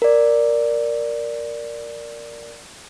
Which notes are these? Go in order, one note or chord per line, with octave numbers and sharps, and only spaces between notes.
A#4 D5